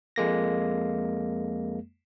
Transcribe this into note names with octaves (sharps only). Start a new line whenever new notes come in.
F2 G#3 A#3 A#6